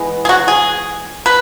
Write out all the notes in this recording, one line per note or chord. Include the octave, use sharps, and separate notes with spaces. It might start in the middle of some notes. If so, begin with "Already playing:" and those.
Already playing: E3 G#3 B3
G#4
F#4
G#4
B4